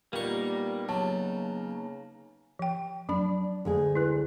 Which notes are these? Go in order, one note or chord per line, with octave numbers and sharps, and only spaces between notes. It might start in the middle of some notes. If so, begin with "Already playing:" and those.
A#2 G3 A#3 B3 D#4 C#6
C#3 F#3 A5
F3 G5
F#3 D4 B5
D2 G#3 G#4
E4 B4